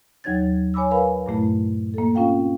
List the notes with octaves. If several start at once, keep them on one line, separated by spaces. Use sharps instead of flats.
D#2 F#3 D#4 C#5 G#6 A6
C#5 G#5 B5 D6 E6
A#4 B4 F5 G#5 B5
G2 A#2 A3 E4
A#3 A4
C4 C#4 F4 F5 G5